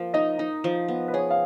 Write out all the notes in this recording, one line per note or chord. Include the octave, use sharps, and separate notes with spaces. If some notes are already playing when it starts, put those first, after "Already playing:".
Already playing: F3 A#3 A#4
D#4 D#5
D#4
F3
B3
B4
G#4 C#5
F5